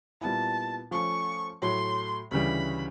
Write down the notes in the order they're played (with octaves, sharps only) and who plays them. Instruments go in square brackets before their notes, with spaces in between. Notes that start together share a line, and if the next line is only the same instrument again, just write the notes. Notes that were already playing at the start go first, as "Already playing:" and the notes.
[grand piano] A#2 G3 B3 E4 [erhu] A5
[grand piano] F3 A3 C#4 [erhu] C#6
[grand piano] A2 F#3 A3 [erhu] C6
[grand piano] D2 C#3 E3 G3 [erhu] B5